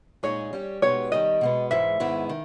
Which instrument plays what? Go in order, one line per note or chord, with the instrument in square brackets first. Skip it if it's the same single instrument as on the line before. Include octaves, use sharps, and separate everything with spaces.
[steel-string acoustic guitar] A#2 G#3 D#4 G#4 [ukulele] C#5
[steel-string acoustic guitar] G3 C#4 G4
[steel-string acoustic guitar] B2 G#3 B3 D#4 G4 [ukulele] C#5
[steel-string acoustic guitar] D#3 G3 C#4 G4 [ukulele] D#5
[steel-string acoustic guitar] B2 G#3 B3
[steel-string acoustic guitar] G#2 E3 G#3 [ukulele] E5
[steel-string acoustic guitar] G#2 D#3 G#3 B3 E4
D#3